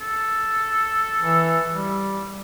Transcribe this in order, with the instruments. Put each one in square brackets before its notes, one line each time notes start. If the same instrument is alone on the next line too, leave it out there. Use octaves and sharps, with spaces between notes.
[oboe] A4
[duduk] E3
G3